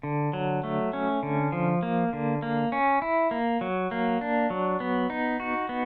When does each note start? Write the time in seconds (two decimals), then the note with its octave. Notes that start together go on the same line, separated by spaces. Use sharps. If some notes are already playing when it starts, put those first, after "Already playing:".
0.03 D3
0.33 F#3
0.63 A3
0.93 C#4
1.23 D3
1.52 F3
1.83 A#3
2.13 D3
2.42 A#3
2.72 C#4
3.02 E4
3.31 A#3
3.61 F#3
3.91 A#3
4.21 D4
4.50 F#3
4.80 B3
5.10 D#4
5.40 F#4
5.69 B3